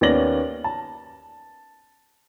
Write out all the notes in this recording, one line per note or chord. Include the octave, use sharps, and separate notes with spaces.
D#2 B3 C#4 D5 A#6 F#7
A5